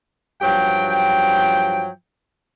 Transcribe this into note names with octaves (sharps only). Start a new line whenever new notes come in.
G2 F3 F#3 G5